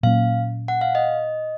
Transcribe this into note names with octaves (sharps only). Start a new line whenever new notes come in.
A#2 F#3 A#3 C#4 F5
F#5
F5
D#5